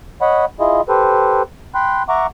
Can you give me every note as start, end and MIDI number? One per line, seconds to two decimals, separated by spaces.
0.21 0.45 73
0.21 0.45 75
0.21 0.45 78
0.21 0.45 83
0.60 0.81 64
0.60 0.81 65
0.60 0.81 68
0.60 0.81 75
0.88 1.42 67
0.88 1.42 69
0.88 1.42 71
0.88 1.42 72
1.75 2.03 79
1.75 2.03 83
1.75 2.03 84
1.75 2.03 90
2.09 2.26 76
2.09 2.26 78
2.09 2.26 82
2.09 2.26 85
2.09 2.26 86